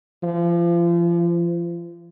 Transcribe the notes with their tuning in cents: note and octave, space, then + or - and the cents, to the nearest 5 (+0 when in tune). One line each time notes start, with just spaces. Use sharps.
F3 -35